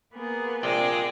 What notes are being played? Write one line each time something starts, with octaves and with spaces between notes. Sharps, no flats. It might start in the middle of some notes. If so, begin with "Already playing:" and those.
A#3 B3 G#4
A#1 C3 G#3 C4 F4 D5